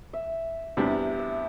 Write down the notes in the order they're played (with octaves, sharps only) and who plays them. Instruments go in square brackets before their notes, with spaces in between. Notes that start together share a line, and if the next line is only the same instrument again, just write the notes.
[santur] E5
[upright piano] E2 C3 G3 D4 G4 [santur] E5
[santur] E5